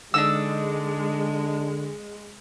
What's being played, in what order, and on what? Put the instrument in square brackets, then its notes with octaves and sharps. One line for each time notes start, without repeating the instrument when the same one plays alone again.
[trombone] D3 [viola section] G#3 [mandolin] D4 D#4 E6